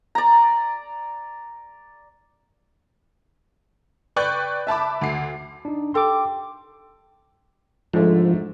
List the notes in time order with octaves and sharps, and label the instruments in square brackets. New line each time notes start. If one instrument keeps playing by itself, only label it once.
[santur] D5 A#5
[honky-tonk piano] B4 D5 G5 C#6 F#6 G6
E5 A5 B5 D6
D2 C7
[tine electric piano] D4 D#4
[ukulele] G4 A4 G5 [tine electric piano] C6 D6
[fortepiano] G#2 D3 A3 [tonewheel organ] F3